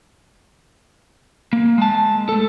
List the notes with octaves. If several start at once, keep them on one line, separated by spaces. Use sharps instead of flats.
A#3
G#3 A5
A3 A4